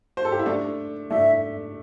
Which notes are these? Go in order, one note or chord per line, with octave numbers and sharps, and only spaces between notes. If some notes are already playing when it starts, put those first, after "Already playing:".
C5
A4
G4
E4
A3 D4
A3 D4 E5